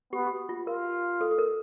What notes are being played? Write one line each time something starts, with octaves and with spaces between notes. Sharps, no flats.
B3 G4
G4
F#4
F4
F4 A#4
A4
A4
A#4